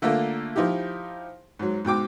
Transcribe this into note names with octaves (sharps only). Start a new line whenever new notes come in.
D3 A3 A#3 F4 A#4
F3 D#4 E4 G4
G#2 F#3
G#2 B2 G5 D6